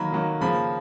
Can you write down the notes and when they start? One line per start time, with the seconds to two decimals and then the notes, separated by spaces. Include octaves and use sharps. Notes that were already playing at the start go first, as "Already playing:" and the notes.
Already playing: D#3 F#3 A#3 B5
0.12 D#3 F#3 A#3
0.41 C#3 F3 A#3 B5